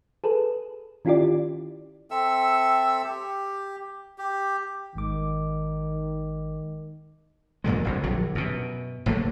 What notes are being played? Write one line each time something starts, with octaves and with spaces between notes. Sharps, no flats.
G#4 A4 B4
D#3 C#4 E4 F4 G4 D5
C4 A4 E5 E6
G4
G4
G#1 D#3 G#3 D6
F2 A#2 D3 G#3
F#1 C2 D3
A#1 D3 F#3
F#2 B2
F#1 A2 A3 A#3